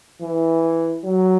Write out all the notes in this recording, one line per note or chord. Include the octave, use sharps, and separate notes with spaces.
E3
F#3